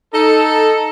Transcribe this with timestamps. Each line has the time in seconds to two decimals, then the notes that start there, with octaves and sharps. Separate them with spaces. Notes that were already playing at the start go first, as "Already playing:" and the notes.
0.14 D#4 A4